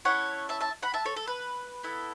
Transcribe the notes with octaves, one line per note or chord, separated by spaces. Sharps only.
C#4 E4 A4 C#5 F#5
E5 A5
E5 A5
F#5 B5
E5 A5
A4 C#5
A4
B4
B3 E4 A4